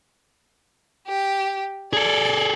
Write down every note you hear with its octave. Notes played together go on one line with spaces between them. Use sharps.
G4
G#4 A4 D5